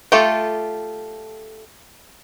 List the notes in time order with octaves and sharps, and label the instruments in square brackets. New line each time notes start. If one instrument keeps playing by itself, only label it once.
[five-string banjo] A3 F4 G4 A4